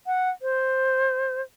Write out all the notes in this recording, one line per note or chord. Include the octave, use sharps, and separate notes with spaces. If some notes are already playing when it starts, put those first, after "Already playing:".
F#5
C5